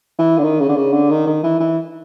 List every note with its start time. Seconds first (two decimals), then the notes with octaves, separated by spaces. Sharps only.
0.19 E3
0.38 D3
0.43 D#3
0.60 C#3
0.69 D3
0.76 C#3
0.93 D3
1.10 D#3
1.27 D#3
1.43 E3
1.60 E3